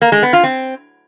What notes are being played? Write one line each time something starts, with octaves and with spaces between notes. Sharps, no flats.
A#3
G#3
B3
F4
C4